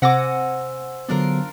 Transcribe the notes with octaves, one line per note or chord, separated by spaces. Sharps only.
C3 C5 F#5 G#5 D6 E6 A#6
D3 F#3 B3 D4 F4 A#4